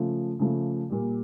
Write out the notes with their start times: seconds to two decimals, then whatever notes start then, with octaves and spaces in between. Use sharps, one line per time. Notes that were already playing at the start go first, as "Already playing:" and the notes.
Already playing: C#3 F3 A3
0.39 C#3 F3 A3
0.90 A#2 G3